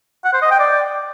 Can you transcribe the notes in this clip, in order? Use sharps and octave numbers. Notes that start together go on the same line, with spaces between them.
F#5
C5
D#5
G5
D5